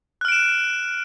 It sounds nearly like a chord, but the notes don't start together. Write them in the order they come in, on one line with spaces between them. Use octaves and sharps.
F#6 F6 D7 E7